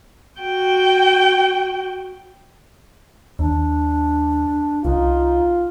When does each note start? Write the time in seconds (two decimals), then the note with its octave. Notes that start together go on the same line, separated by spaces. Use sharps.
0.41 F#4 G5
3.39 D#2 D4
4.85 C2 D#4 F4